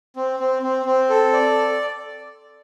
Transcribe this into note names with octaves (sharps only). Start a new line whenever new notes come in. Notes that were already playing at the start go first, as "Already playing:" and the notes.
C4
C4
C4
C4
A4
D5